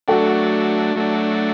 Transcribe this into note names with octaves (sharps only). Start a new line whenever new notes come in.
F#3 A3 D4 F#4 A4
F#3 A3 D4